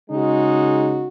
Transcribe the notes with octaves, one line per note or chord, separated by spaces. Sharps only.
C#3 G#3 D#4 F#4